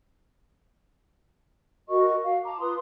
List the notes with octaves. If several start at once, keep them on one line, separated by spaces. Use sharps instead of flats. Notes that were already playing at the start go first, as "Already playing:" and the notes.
F#4 A#4 D#5 C#6
F#4 F5
A5 A#5 D6
F4 B4 C6 D#6